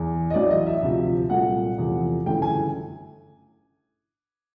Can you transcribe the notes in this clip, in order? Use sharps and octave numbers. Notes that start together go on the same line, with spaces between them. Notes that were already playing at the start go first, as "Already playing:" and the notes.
Already playing: E2
D#5
A1 A2 F#3 D5
D#5
E5
D2 C3 F3
C2 A#2 F#3 A3 F#5
E2 C3 F3 A3
G1 F#2 C#3 E3 A3 G5
G#5